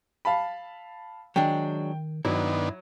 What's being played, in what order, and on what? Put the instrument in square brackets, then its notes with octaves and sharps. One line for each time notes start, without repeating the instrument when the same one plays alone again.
[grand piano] F5 A5 B5
[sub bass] D#3 [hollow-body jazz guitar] F#3 G#3 D4 [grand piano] G5
[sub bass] G2 [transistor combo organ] D#3 B3 D4 [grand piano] F#3 [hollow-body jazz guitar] E4